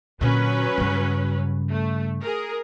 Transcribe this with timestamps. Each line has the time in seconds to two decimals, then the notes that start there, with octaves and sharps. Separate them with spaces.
0.21 A#2 D3 F#3 C#4 B4
0.78 G2 C#3
1.70 A3
2.21 G#4 A#4